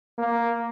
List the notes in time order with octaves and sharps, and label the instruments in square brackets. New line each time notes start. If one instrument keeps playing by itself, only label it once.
[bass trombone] A#3